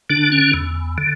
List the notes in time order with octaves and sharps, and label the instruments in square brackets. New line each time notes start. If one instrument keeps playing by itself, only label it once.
[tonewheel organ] D3 D4
C#4
E2
D3